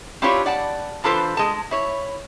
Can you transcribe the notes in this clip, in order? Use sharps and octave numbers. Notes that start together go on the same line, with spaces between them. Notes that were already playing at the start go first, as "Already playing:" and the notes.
C4 D4 E4 F4 G4 C#5
D5 F#5 A5
E3 D4 F4 A4 B4 C5
G#3 A5
E4 C#5